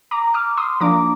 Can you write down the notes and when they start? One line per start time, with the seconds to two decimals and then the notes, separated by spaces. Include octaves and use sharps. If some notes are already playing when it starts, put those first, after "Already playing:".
0.11 A#5 D6
0.34 D6 F6
0.57 C6 D#6
0.80 F3 A#3 D4 A#5 D6